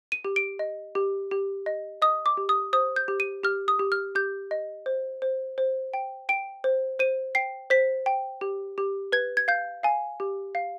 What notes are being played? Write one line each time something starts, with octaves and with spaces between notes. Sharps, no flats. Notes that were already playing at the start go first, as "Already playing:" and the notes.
D#7
G4
D7
D#5
G4
G4
D#5
D#5 D#6
D6
G4
D#6
C5 D#6
G6
G4
D#7
G4 F6
D#6
G4
F6
G4 G6
D#5
C5
C5
C5
G5
G5 D7
C5
C5 D#7
G5 C7
C5 B6
G5
G4
G4
B4 G#6
G#6
F5 G6
F5 G#5
G4
F5